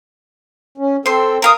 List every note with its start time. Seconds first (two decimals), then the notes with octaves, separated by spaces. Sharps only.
0.78 C#4
1.06 C4 A4 C5 C6
1.42 A#4 F5 D#6